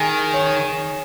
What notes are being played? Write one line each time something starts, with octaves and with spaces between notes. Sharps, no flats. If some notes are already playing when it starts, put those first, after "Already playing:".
Already playing: D#3 G#4
C#5